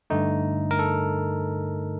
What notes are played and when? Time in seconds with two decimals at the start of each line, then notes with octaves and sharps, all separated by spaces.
0.10 G2 D3 A3 D#4
0.71 A#4
0.79 A4